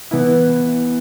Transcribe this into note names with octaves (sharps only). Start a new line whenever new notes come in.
E3 B3 E4